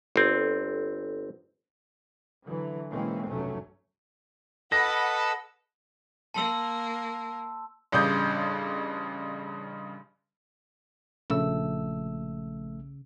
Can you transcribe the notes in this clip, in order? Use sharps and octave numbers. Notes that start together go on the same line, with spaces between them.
G1 C4
D3 E3 F#3
B2 E3 G#3 A#3 C4 C#4
F1 B1 G2 F#3 A3 C#4
A4 B4 D#5 F#5 B5 A#6
A#3 A5 C6 E6
A1 G2 C#3 D5 D#6 G6
A#1 C#3 A3 E6